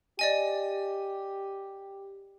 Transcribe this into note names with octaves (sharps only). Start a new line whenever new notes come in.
G4 D5 D#5 G#5